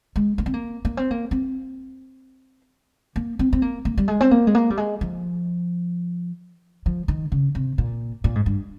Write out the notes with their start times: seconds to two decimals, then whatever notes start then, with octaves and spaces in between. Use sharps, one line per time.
0.16 G#3
0.38 A#3
0.46 C4
0.54 A#3
0.85 A#3
0.97 C4
1.11 A#3
1.31 C4
3.16 A#3
3.39 C4
3.53 C4
3.62 A#3
3.85 A#3
3.98 G3
4.08 G#3
4.21 C4
4.31 A#3
4.47 G#3
4.55 A#3
4.70 G3
4.77 G#3
5.01 F3
6.86 F3
7.08 D#3
7.32 C#3
7.55 C3
7.78 A#2
8.24 A#2
8.35 G#2
8.46 G2